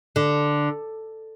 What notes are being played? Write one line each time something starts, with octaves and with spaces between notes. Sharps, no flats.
D3